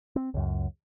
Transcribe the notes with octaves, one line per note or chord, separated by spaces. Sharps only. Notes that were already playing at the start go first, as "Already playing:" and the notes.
C4
C#2 F#2